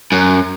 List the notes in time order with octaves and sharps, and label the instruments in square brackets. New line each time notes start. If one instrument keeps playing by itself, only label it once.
[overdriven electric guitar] F#2